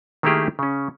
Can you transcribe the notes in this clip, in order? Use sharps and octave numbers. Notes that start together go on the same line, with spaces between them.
D#3 A3 A#3 E4 G4 G#4
C#3 C#4